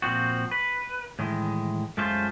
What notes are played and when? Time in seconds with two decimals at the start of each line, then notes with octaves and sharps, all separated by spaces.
0.02 A#2 F3 C4 F#4
0.51 B4
1.19 A2 D#3 E3 G#3
1.97 F#2 G#3 A3 F4 C5